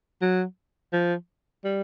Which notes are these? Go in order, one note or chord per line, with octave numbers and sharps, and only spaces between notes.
F#3
F3
G3